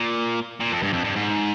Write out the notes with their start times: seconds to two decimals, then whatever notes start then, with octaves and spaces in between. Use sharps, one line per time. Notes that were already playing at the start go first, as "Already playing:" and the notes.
Already playing: A#2
0.60 A#2
0.72 F2
0.83 G2
0.93 F2
1.04 G2
1.16 G#2